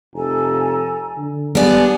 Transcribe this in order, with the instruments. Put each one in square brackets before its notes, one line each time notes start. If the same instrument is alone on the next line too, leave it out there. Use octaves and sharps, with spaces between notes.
[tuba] F1 [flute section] A4 G#5 A#5
[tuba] D3
[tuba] G3 [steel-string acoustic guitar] B3 D5 [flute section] D4 G#5